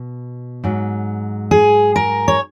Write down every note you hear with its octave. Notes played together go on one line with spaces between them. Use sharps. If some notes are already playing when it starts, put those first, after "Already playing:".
Already playing: B2
G#2 F#3
G#4
A#4
C#5